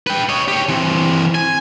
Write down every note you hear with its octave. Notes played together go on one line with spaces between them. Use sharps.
B4 G5
C#5 D#5
G4 C#5
E3 C4
G#5